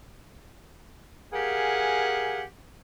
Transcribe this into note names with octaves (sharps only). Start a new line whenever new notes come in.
G4 G#4 A#4 F5 F#5 G#5